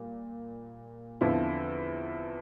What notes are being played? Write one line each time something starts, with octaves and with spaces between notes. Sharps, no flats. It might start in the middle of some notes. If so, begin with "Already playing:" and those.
Already playing: A#2 G3
E2 D3 F3 C4 E4